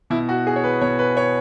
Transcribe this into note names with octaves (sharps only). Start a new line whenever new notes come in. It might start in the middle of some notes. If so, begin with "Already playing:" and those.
B2 E4
F#4
G#4
C#5
B4
B2 C#5
B4
C#5